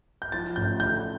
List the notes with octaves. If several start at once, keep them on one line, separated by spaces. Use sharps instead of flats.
G6
F3 A6
A1 G6
D3 G6